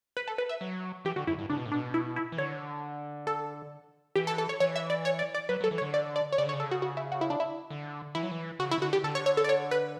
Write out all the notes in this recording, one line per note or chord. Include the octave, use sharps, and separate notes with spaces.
B4
A4
B4
E5
F#3
E3 G4
D3 F#4
F#2 E4
G2
C#3 D4
B2
A2
B2 D4
E4
E4
E3
D3 C#5
A4
E3 G4
A4
A4
C#5
E3 C#5
E5
D5
C#5
D5
D5
F#3 B4
F#3
A4
E3
C#5
D3
D5
D5
C#5
C#3 D5
D3
C#5
C#3
A4
F#4
F#4
E4
F#4
E4
D4
E4
D3
E3 E4
F#3
E3
C#3 F#4
E4
C#3
D3 F#4
G4
D3 A4
C#5
C#5
A4
D5
C#5
B4